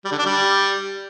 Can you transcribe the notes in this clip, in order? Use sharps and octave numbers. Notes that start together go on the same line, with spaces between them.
G3
D3
D4
G3